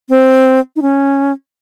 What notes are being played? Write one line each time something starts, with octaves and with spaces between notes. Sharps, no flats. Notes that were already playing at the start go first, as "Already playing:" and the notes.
C4
D#4
C#4